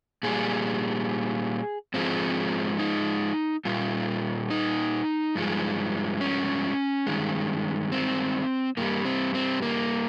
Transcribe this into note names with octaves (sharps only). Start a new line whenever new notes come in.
A#2 G3 G#4
G#2 F3 G#3 C4
D#4
A#2 G3 F4
D#4
G2 F3 G#3
C#4
G2 D#3 G#3
C4
G2 G3 A#3
C4
C4
A#3